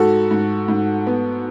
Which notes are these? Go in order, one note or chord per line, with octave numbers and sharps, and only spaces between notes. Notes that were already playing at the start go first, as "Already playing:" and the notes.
Already playing: G#2 F#4 A4
G#2
G#2
B3